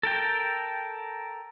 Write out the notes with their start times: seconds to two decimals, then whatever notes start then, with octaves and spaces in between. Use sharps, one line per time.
0.03 A4 A#4 G5